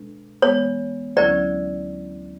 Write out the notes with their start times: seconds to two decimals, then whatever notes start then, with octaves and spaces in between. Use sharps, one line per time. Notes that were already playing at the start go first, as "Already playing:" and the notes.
Already playing: B2 G#3 D4 A4
0.42 E3 G#3 B3 C#5
1.17 D2 D3 F#3 C#4 E4 D5